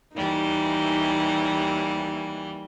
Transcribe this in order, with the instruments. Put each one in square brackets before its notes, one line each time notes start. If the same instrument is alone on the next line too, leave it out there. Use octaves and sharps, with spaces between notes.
[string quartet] D#2 E3 G3 [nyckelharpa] D#4